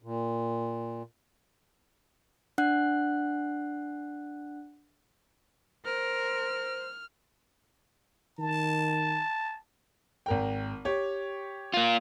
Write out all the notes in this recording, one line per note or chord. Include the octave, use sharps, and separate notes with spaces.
A#2
D4 F#5 F#6
A#4 C5 F6
D#3 A5
G#1 A#4 G5
G4 C#5
A#3 F4